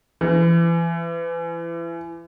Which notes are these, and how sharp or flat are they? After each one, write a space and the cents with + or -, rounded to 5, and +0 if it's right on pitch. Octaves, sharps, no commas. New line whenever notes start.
E3 +30